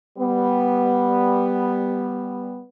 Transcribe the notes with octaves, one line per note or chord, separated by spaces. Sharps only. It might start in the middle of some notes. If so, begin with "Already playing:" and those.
G3 B3